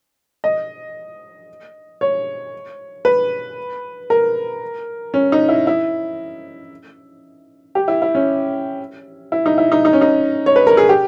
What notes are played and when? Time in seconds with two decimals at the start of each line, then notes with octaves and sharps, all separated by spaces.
0.44 D#5
2.01 C#5
3.05 B4
4.10 A#4
5.14 C#4
5.32 D#4
5.49 E4
5.67 E4
7.75 G4
7.88 E4
8.02 E4
8.15 C#4
9.32 E4
9.46 D#4
9.58 E4
9.72 D#4
9.85 D#4
9.93 C#4
10.01 D#4
10.46 C#5
10.56 B4
10.67 A#4
10.77 G#4
10.89 G4